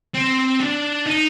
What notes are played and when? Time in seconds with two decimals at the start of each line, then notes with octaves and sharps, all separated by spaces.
0.15 C4
0.60 D4
1.07 D#4